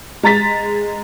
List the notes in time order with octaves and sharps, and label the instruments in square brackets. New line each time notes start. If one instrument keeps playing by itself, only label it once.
[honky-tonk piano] G#3 A#5 A6 B6